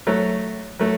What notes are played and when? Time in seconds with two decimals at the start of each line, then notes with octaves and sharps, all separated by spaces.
0.07 F#3 A3
0.79 F#3 A3